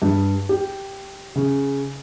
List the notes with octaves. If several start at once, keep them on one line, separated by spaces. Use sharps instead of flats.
G2
G4
C#3